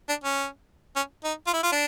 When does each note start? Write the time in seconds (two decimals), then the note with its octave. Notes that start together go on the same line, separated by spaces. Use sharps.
0.09 D4
0.24 C#4
0.96 C#4
1.24 D#4
1.47 F4
1.53 E4
1.63 F4
1.72 D4